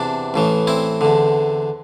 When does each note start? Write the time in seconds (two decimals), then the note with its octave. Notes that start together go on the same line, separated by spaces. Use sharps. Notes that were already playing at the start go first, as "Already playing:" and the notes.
Already playing: E2 C3 E3 D4
0.34 A1 A2 E3
0.67 C4 E4
1.01 E2 D3